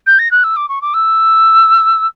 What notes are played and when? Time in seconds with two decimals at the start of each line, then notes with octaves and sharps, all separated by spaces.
0.07 G6
0.19 A#6
0.31 F#6
0.44 E6
0.56 D6
0.69 C#6
0.82 D6
0.94 E6